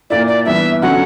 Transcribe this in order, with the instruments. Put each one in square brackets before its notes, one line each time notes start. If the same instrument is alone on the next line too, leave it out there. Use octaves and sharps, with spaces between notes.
[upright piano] A#2 A#3 E4 [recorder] D5
[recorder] D5
[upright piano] G2 E3 B3 [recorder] E5
[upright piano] D3 F#3 C#4 [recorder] F#5